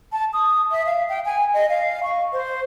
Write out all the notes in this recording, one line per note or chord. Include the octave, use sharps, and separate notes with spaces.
A5
D#6
E5
F5
G5
G#5
D#5
F5
C#6
C5